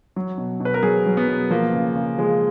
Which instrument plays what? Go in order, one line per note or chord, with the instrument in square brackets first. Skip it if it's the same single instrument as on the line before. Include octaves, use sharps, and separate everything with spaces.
[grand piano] F#3
B2
B2
B4
A#4
F#3 G#4
F#3
B3
B2
F3 A#3
C#3
C#3
F3 G#3